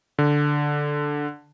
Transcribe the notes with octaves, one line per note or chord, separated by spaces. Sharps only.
D3